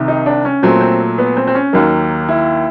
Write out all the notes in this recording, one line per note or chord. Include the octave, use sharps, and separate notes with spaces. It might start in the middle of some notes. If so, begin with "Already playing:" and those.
Already playing: C2 C3 D#3
D#4
D4
C#4
A#2 F#3 A3 C4
C4
B3
C4
C4
C#4
D#2 D#3 F#3 A#3
E4